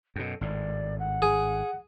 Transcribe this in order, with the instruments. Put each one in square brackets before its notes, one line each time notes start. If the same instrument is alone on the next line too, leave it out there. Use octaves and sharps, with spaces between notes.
[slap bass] F#2 B2 [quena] A4
[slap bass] G#1 A2 [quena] D5
[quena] F#5
[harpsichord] G#4